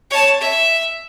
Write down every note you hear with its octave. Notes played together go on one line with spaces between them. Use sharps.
C#5 A5
E5